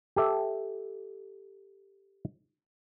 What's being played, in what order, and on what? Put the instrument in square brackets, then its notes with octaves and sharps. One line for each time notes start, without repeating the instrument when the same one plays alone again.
[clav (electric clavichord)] G4 A4 E5